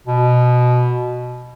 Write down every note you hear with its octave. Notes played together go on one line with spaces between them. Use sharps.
B2